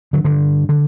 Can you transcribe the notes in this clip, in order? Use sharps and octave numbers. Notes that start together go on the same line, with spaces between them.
D3 F#3
G2 D3
D3